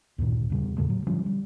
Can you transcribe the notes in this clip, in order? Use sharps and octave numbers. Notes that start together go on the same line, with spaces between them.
D2 G2 A#2 D#3
E2 C#3 G3
E2 A2 C#3 A3
F#3
D3 F3 G3 C#4
G3